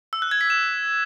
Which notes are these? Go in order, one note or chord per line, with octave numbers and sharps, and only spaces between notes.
E6
F#6
G#6
B6
E7